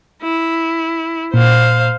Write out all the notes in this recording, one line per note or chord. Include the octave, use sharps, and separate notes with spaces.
E4
A#2 C5 F5